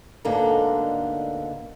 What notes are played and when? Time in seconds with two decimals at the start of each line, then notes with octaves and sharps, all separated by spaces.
0.25 D2 G#2 D3 A#3 B3 D#4